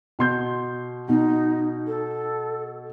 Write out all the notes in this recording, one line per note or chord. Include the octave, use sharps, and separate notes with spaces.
B2 C6 G6
B2 D#4
A4